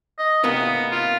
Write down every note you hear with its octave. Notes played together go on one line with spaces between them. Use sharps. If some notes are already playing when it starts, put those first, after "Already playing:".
D#5
C3 A#3 B3 D#4
F4